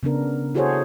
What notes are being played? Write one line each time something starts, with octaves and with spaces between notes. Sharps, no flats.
C#3 B3 D4 A#4
E4 F#4 G#4 A4 C5 C#5